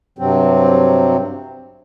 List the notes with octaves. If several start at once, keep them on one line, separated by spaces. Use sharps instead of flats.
G2 C3 F#3 C4